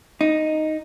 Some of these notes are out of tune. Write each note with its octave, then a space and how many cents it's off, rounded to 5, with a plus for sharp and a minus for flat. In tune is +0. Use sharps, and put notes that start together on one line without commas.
D#4 +0